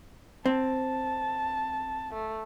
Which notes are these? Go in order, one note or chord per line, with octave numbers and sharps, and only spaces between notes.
C4 A5
A3